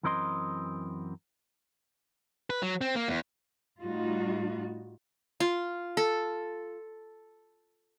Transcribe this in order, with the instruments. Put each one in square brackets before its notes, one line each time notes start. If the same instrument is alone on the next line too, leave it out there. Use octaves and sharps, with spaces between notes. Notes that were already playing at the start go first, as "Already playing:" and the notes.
[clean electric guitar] F#2 E3 C4 A#4 D#5 C6
[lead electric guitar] B4
F#3
C4
A#3
E2
[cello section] A2 G3 D#4 F4 F#4
[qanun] F4
A4